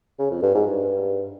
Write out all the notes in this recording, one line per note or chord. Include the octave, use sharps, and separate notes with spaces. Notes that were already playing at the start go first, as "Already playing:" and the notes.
C#3
F2
G2
G#2
G2